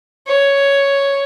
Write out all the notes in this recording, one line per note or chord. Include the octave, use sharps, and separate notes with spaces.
C#5